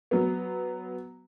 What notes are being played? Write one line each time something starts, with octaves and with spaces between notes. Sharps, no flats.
F#3 B3